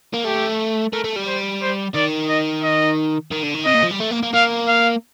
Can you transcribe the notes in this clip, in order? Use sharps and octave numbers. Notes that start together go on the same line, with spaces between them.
A#3
A3 G4
A3 A#4
A3
G3
C5
C5
D#3 D5
D#5
D#5
D#3
D3
D#3
C3 D#5
A#2
F3
G3
A3
A#3
A#3
A#3 F5
F5